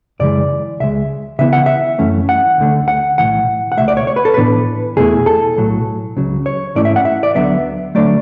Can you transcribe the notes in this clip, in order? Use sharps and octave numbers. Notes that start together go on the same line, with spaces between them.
F#2 C#3 E3 G#3 D5
C#2 C#3 G#3 E5
C#3 E3 B3 E4 E5
F#5
E5
F#2 E3 A3 C#4
F#5
D2 D3 A3 D4
F#5
B1 A2 E3 F#5
F#5
C#2 B2 A3 E5
D5
C#5
C#5
B4
A4
A2 E3 B3 D4 B4
E2 B2 A3 E4 G#4
A4
B1 A2 F#3
C#2 C#3 F#3
C#5
G#2 E3 A3 C#4 E4 D5
E5
F#5
E5
D5
D2 D3 F#3 B3 E5
D3 F#3 A3 D5